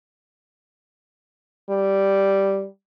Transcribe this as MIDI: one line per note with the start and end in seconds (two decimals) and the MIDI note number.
1.70 2.66 55